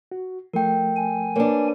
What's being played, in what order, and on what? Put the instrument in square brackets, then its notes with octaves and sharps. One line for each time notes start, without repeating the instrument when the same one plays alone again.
[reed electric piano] F#4
[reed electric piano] F3 A3 [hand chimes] A#4 G5
[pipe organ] G#5
[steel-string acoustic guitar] A#3 D4 [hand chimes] A#4 B4 C#5